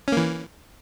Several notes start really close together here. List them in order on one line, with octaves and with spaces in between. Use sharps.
C#4 A#3 E3